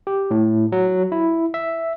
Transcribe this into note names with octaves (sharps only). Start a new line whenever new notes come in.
G4
A2
F#3
E4
E5